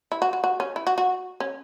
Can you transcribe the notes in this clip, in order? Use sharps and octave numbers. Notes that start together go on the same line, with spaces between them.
E4
F#4
F#4
F#4
C#4
E4
F#4
F#4
C#4